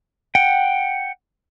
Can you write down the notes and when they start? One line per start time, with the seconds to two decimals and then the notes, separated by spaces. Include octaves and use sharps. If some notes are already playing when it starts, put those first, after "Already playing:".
0.35 F#5 G5